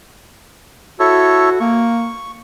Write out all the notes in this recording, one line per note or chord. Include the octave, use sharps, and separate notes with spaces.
E4 F#4 A4 C#5
A#3 C#6